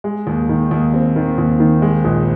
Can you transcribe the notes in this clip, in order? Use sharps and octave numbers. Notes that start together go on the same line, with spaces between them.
G#3
D#2
D#3
D#2
C4
D#3
D#2
D#3
G#3
A#1